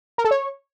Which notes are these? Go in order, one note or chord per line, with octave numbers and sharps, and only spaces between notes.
A#4
A4
C#5